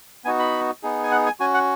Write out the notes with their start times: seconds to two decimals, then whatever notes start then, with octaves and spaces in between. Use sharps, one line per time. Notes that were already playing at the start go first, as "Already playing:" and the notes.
0.25 B3 D#4 F#4 G#5
0.39 B5
0.83 B3 D#4 G#4
1.03 G#5
1.12 F#5
1.26 G#5
1.40 C#4 F#4 G#5
1.54 F#5